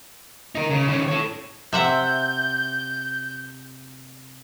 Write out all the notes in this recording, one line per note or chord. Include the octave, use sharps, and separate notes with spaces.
D#4 A#4
C#3
D#3 C#4
A4 C#5
C3 E5 F#5 G6